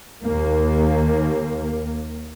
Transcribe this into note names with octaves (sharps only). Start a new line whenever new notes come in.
D#2 A#3